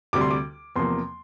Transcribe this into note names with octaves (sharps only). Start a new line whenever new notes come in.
D2 C3 G3 D6
C6
D6
E2 C3 F3 A#3 C6